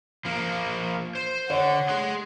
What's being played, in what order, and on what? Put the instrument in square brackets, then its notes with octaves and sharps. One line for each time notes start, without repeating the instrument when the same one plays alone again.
[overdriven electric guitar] F3 A#3
C5
[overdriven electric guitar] D3 [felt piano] C#5 [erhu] F#5
[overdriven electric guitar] G#4 C6